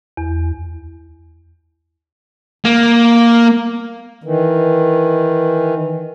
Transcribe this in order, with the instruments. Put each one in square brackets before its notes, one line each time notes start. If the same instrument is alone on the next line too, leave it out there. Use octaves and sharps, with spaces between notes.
[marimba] E2
[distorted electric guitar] A#3
[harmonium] D#3 E3